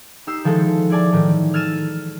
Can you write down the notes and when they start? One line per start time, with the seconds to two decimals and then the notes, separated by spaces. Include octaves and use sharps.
0.27 D#4 G4 E6 C7
0.44 D#3 F3 G#3 E4 A4
0.90 E4 G#4 D5 G#5 A5
1.12 A2 D#3 E3
1.53 E6 F6 G#6 A6 D#7 E7